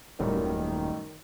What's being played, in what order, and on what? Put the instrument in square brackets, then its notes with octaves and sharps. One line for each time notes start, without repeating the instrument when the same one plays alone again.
[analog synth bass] D#1 [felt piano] F#2 A2 G3 [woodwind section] D#3